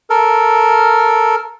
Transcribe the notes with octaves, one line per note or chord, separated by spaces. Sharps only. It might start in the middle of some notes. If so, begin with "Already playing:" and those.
A4 A#4